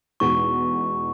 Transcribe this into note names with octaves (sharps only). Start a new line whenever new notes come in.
E2 B2 G#3 D#4 F#4 C#6